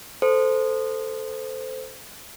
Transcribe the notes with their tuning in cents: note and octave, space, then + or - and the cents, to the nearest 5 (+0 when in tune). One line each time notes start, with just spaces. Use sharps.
A4 +0 C5 -15